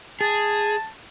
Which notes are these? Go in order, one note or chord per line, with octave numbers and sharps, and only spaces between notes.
G#4 A5